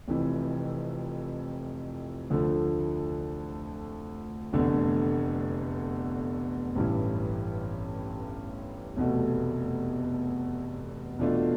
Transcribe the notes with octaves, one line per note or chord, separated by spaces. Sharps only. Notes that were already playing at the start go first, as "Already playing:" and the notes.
F1 F2 E3
D2 D3 F3 A3
F1 E2 D3 A3 D4
A1 G2 E3
F1 E2 B2 A3
E2 B2 A3 D4 F4